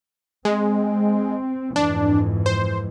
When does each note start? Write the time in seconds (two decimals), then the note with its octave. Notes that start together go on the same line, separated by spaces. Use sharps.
0.45 G#3 C4
1.76 F2 G#2 E3 D4
2.46 C5